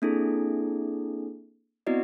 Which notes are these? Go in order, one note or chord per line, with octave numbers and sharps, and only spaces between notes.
A#3 C4 D4 E4 G#4 A4
B3 C4 E4 F#4 D5 D#5